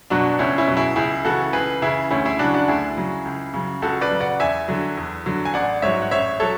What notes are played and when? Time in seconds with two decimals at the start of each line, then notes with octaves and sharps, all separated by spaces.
0.10 B2 F#3 D4 F#4
0.39 C#2 C#4 E4
0.58 C#4 E4
0.68 B2 F#3
0.77 E4 G#4
0.96 C#2 E4 G#4
1.25 C#3 E3 F#4 A4
1.53 C#2 G#4 B4
1.82 C#3 E3 E4 G#4
2.11 D2 C#4 E4
2.25 E4 G#4
2.39 C#3 F#3 D4 F#4
2.54 D4 F#4
2.68 D2 E4 G#4
2.97 C#3 F#3
3.25 C#2
3.54 C#3 F#3
3.82 C#2 F#4 A4
4.01 B4 D5
4.11 C#3 F#3
4.21 D5 F#5
4.40 E2 E5 G#5
4.68 D3 F#3
4.97 E2
5.26 D3 F#3
5.45 G#5
5.54 A1 D5 F#5
5.82 G#2 F#3 C#5 E5
6.02 F#5
6.11 A1 C#5 E5
6.40 F#3 A4 C#5